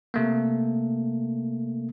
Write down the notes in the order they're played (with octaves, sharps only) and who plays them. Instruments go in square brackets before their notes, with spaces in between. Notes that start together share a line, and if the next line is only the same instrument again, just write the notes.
[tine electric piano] C3 A3 A#3